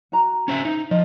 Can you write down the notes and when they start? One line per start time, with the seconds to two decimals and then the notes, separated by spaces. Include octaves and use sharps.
0.12 F#4 A#5
0.48 C#4 C5 E5
0.65 D#4
0.91 F3 D#5